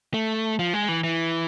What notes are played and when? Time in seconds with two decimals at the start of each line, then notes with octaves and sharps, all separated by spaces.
0.14 A3
0.59 F3
0.74 G#3
0.89 E3
1.04 E3